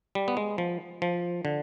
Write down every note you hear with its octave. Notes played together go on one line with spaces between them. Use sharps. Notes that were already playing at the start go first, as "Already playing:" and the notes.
G3
B3
G#3
F3
F3
D3